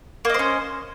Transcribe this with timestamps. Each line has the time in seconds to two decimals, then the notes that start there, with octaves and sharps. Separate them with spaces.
0.25 A#3
0.30 D#5
0.34 C5
0.39 C#4